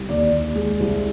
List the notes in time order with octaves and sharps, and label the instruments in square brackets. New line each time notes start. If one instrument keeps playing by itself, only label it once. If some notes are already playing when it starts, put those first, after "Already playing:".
Already playing: [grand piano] C2
D#2 D5
D#2
G#3
C2